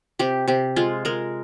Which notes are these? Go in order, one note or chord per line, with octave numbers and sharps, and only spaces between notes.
C3 G4
C3 G4
G#3 F4
G#3 A#4